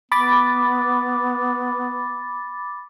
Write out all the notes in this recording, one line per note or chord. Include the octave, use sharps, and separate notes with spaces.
B3 B5 D6 A6